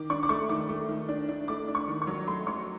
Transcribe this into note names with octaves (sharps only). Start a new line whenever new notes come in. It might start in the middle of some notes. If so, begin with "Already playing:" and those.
Already playing: D#3 D6
D4 C#6
D6
A3 C#6
D#3 D6
A3
D#3
D4
D4
A3 D6
D4
C#6
D#3
C#6
F#3
A3 C6
F#3 C#6